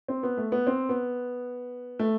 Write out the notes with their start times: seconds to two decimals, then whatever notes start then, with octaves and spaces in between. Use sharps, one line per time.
0.08 C4
0.23 B3
0.38 A3
0.52 B3
0.67 C4
0.89 B3
1.99 A3